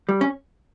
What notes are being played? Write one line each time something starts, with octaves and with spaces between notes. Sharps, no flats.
G3
C#4